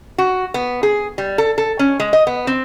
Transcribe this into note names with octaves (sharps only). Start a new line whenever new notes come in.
F#4
B3
G#4
G3
A4
A4
C#4
G#3
D#5
B3
C4